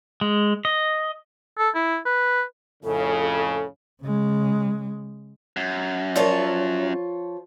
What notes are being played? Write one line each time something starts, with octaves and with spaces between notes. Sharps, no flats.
G#3
D#5
A4
E4
B4
F2 A2 C#3 A4
C#3 G#3
F#2
F3 F4 A#4 C#5 D5